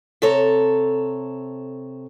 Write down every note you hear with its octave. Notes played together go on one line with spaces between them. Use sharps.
C3 A4 C#5 A#5